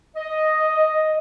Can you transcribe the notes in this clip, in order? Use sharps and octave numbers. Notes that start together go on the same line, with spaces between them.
D#5